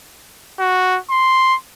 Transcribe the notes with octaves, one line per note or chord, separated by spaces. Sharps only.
F#4
C6